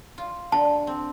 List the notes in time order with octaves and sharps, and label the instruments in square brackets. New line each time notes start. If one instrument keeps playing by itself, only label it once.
[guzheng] F4
[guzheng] D3 [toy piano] A5
[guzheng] C4